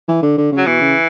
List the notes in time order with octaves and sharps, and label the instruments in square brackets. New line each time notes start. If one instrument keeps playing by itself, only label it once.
[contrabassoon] E3
D3
D3
C#3
[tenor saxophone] F#3
[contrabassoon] B2 [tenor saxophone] E3
[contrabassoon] C#3